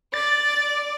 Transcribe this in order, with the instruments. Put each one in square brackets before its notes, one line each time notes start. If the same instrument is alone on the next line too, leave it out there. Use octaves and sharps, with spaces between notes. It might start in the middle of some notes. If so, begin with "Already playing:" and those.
[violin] D5 [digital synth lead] A6